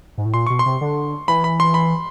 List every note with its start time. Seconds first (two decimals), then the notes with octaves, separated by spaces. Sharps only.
0.18 G#2
0.25 A2
0.34 A#2 C6
0.47 B2 C#6
0.59 C6
0.66 C3
0.81 D3
1.28 E3 B5
1.44 B5
1.60 C6
1.74 B5